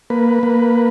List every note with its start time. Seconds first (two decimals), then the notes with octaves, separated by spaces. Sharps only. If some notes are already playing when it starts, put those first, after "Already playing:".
0.10 A#3 B4
0.43 A#3